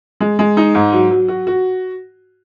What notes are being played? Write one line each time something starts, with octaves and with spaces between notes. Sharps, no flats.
G#3
G#3
D#4
G#2
F#3
F#3
F#4
F#4